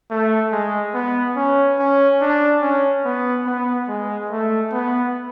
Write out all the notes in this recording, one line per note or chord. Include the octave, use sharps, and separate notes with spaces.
A3
G#3
B3
C#4
C#4
D4
C#4
B3
B3
G#3
A3
B3